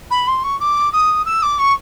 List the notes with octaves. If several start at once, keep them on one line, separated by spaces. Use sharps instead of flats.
B5
C6
C#6
D6
D#6
E6
D6
C#6